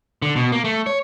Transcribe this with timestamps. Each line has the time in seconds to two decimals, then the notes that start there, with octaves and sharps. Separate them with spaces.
0.22 D3
0.36 B2
0.52 A#3
0.64 A3
0.86 C#5